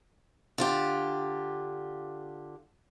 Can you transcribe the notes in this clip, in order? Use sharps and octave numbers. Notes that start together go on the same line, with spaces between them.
D3 F4 G4